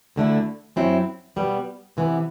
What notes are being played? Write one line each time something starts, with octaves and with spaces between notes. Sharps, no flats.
D2 D3 A3 E4
F#2 F#3 C4 E4
B2 G3 B3
C3 E3 B3